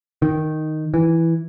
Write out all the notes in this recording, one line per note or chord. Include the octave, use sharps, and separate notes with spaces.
D#3
E3